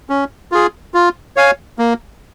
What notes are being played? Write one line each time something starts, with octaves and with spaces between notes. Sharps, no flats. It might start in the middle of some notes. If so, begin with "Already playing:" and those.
C#4
F4 G#4
F4
C#5 F5 G#5
A#3